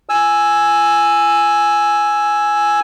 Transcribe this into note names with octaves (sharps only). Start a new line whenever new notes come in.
G#5 E6